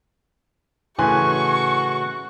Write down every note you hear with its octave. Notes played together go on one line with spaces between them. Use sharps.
A2 C#3 E3 F#4 G#5 C6 C#6 F#6